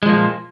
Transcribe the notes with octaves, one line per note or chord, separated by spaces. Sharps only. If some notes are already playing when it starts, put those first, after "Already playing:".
A#2 F3 G#3 A#3